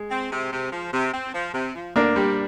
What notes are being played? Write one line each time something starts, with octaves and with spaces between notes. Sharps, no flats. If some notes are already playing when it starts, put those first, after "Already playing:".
Already playing: G#3
C4
C3
C3
F3
C3
C4
F3
C3
F3
D2 A#3 D4
G3 C4